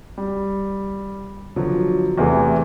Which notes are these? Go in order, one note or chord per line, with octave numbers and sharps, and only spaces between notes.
G3
B2 D3 F3 F#3
E2 C3 E3 A3